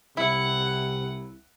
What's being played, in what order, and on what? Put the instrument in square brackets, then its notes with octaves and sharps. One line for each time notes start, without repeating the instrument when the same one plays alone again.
[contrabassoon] C2 [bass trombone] C3 [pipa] E4 [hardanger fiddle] F#5